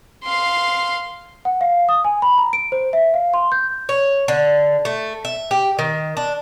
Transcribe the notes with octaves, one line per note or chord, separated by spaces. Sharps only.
F5 C6
F#5
F5
D#6
G#5
B5
A#5
D7
C5
E5
F5
C6
G6
C#5
D3
A3
E5
G4
D#3
D4